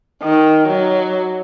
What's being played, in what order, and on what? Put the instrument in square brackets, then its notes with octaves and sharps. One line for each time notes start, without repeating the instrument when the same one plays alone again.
[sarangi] D#3
F#3